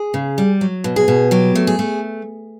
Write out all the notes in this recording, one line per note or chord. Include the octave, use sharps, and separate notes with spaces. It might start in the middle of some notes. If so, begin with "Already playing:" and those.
Already playing: G#4
C#3
G3
F#3
B2
G#4
B2
F#3 G4
A3
G#4
A3